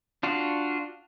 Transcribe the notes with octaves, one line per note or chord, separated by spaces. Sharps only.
D4 F4 F#4